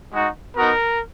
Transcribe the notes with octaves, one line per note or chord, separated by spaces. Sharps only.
G#3 D#4 F#4
B3 D#4 F#4 A#4